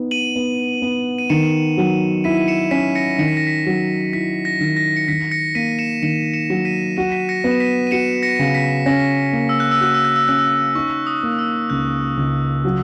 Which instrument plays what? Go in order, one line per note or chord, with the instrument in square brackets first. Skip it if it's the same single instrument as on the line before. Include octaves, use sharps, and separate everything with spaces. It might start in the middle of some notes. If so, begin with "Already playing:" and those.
Already playing: [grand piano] B3 D#4
[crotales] D#7 F#7
[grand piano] B3
B3
[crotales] D#7
[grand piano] D#3 [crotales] C#7 E7
[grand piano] F#3
[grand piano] E4 [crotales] B6 D#7
[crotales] D#7
C#7 E7
[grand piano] C#4 [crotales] B6 D#7
[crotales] A#6 C#7
[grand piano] D#3 [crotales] C#7
[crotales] B6
A#6
B6
[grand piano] F#3
[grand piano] E4 [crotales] B6
[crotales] A#6
[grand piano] D#3
[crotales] A#6
C#7
[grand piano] D#3 [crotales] B6
[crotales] A#6 C#7
[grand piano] A#3 [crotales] B6 D#7
[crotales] C#7 E7
[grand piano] D#3 [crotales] C#7 E7
[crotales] C#7 E7
[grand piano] F#3
[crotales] E7
B6 D#7
[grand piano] F#4 [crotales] D#7
[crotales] E7
B6 D#7
A#6 C#7
[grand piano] B3
[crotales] E7
B6 D#7
D#7
[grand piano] F#4 [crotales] C#7 E7
[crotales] A#6 C#7
[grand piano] C#3
[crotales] B6
[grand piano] C#4 [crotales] A#6
[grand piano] A#3
[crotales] E6
F#6
E6
[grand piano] F#4 [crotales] F#6
[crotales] E6
F#6
E6
[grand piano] C#4 [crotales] F#6
[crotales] E6
[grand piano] D#4 [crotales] C#6
[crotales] D#6
[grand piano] A#3
[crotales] E6
[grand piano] C#2 [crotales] F#6
[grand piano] C#2
F#3